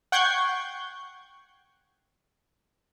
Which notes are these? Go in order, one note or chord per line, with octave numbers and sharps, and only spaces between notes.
F#5 G5 C#6 G6 G#6 C7